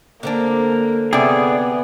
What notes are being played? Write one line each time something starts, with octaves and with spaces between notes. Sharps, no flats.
D3 A#3 C4 D4
C3 B3 G#4 D5 G#5